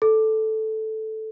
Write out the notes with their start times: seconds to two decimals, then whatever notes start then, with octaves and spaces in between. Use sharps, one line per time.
0.02 A4